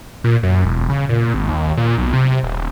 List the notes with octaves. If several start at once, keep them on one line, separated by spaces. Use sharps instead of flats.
A#2
F#2
E1
C#3
A#2
G#1
D#2
A#2
B1
C3
D#1